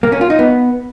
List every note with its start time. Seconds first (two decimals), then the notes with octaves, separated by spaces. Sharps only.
0.03 A#3
0.12 C#4
0.21 F4
0.30 D#4
0.39 B3